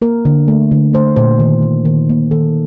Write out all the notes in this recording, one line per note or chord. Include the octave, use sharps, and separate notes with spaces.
A#3 A#4
D3
A3
D3
A3 C5
A#2 C5
D#3
A#3
D#3
A#3
D#3 A4